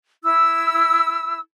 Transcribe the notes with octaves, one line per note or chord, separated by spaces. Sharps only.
E4 E6